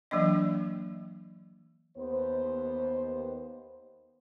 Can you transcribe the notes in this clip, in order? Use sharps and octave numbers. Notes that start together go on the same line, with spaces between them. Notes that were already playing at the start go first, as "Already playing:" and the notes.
E3 F#3 A#3 D4 D#5
D#2 B3 C5